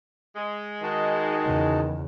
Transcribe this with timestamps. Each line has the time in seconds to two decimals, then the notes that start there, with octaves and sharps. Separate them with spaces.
0.36 G#3
0.83 D#3 D#4 F#4 A5
1.44 E2 C#3